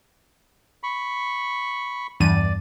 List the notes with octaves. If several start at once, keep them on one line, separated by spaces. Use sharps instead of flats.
B5 C#6
E2 G2 D5 D#7